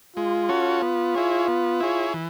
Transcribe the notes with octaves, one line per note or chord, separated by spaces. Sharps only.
G#3 F4
C#4 F#4 A4 C#5
B3
E4 G#4 C#5
B3
E4 G#4 C#5
E3